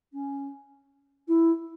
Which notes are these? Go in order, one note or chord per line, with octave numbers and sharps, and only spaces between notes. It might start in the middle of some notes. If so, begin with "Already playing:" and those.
C#4
E4